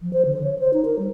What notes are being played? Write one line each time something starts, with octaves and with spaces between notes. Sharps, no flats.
F3
C5
D3
C#5
C5
D#4
A#4
G3